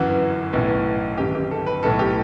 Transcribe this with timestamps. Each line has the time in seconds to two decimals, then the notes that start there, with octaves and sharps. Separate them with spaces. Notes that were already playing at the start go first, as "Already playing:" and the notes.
Already playing: G1 F#2 E3 F#4
0.53 B1 A2 E3
1.18 G1 F#2 D#3 G4
1.35 G4
1.51 A4
1.66 B4
1.83 B1 A2 E3 A4
1.99 G4